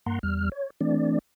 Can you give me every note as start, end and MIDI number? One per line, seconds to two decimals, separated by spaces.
0.06 0.19 43
0.06 0.19 58
0.06 0.19 78
0.06 0.19 82
0.06 0.19 84
0.23 0.49 40
0.23 0.49 55
0.23 0.49 89
0.52 0.70 73
0.81 1.19 52
0.81 1.19 57
0.81 1.19 60
0.81 1.19 62
0.81 1.19 74